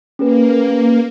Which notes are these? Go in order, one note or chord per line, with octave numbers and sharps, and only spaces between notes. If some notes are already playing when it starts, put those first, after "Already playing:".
A#3 C#4 G#4 B4